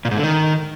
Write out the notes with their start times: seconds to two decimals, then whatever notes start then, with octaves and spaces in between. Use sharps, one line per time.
0.05 A#2
0.11 G#2
0.17 D3
0.23 D#3